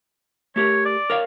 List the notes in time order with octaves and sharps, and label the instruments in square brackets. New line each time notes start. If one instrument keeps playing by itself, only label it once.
[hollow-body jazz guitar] A3 G4 A#4 [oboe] C#5
[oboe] D5
[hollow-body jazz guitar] A#4 C#5 F5